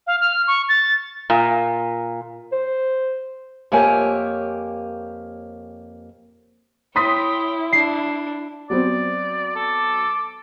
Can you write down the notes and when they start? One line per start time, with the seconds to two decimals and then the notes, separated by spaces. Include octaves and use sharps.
0.07 F5
0.21 F6
0.47 C#6
0.69 A6
1.30 A#2
2.52 C5
3.72 F2 A#3 G4 C#5 G#5
6.96 E4 C#5 G5 C6 D#6 B6
7.72 D4 C7
8.70 F#3 B3 C4 D5
9.56 A4 D6